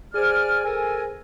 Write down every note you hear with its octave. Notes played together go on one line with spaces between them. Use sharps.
G#4 C5 D5 G#5 F6
A4 A#4 G#5